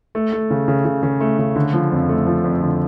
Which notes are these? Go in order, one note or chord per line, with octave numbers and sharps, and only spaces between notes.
A3
A3
C#3
C#3
C#3
C#3
A3
C#3
D3
F3
F2
A3
F3
F2
D3